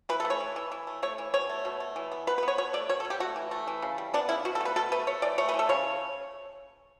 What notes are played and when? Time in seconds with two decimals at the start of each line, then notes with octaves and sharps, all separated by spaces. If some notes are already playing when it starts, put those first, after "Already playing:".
0.09 E3 B4
0.20 A4
0.25 A3
0.30 C#5
0.40 E3
0.56 E3
0.72 E3
0.87 A3
1.02 A3 C#5
1.18 E3
1.34 B2 C#5
1.49 A3
1.65 B2
1.80 A3
1.96 E3
2.12 B3
2.27 B3 B4
2.38 B4
2.43 B3
2.48 C#5
2.58 B2 C#5
2.73 A3 D5
2.89 B2 C#5
3.00 A4
3.05 B2
3.10 G4
3.20 A3 F#4
3.36 E3
3.51 A3
3.67 E3
3.82 C#3
3.98 G3
4.14 B3 D4
4.29 C#3 E4
4.45 B2 F#4
4.55 A4
4.60 A3 B4
4.76 B2 A4
4.92 A3 B4
5.07 A3 C#5
5.22 E3 D5
5.38 A3 C#5
5.49 B4
5.54 E3
5.59 A4
5.69 C#3 C#5